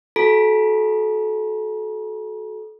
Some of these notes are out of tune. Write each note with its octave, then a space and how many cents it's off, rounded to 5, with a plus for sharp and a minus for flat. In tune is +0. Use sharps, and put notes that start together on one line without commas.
F#4 -5 A4 -30 A#5 +40